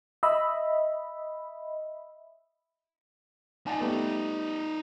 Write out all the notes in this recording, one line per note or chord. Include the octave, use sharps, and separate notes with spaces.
D#5 E5 B5
D#4 D5 G#5 A5
G3 A3 B3